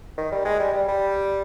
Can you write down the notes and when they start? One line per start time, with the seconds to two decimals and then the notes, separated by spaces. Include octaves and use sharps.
0.18 D#3
0.32 G3
0.45 G#3
0.60 G3
0.74 G3
0.88 G3